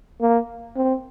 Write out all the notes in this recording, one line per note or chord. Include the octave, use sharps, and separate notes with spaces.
A#3
C4